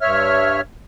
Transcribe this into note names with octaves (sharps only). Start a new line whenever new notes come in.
G2 C#5 E5 F6